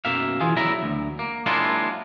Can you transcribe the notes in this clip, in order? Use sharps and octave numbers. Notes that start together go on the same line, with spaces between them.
B1 F#2 A#3 E5 F5
E3 F4 G#4
E2 F#3 E4 E5 A#5
D2
A#3
F#3 G#3 A#3 D4 E4 F4